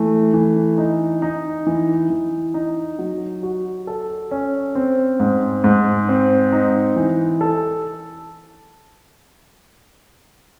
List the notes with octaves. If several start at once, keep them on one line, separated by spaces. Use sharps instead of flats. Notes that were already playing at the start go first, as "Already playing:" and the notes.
Already playing: E3 A3
E3
D#4
D#4
E3
E3
D#4
F#3
F#4
A4
C#4
C4
G#2
G#2
C4
D#4
E3
A4